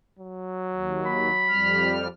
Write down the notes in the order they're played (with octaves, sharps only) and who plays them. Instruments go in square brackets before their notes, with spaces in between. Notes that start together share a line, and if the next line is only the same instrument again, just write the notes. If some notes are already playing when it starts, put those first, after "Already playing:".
[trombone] F#3
[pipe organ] D#2
[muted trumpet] B5
[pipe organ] F2 G3 F6